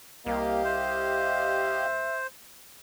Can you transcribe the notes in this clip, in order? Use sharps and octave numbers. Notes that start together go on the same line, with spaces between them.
C2 A#3 G4 D#5 F5
C5 E5